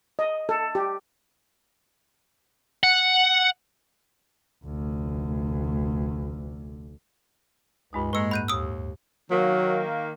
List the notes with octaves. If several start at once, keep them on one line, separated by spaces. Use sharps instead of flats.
D#5
A4
G4
F#5
F1 D2
C#2 G2 G#3 D#4
A2 G#3 A#3 B4 E6
D2 G2 B5 F#6 G6 D#7
D#2 D#6 E6
D#3 F#3 A#3